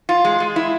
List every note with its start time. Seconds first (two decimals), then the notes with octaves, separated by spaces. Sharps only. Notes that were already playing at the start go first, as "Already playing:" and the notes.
0.09 F4
0.25 G#3
0.40 G#3
0.56 E4